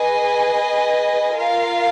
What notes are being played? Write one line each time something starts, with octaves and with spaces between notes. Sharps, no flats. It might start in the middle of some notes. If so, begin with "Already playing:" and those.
Already playing: G#4 B4 D#5 G#5
F4 A#4 F5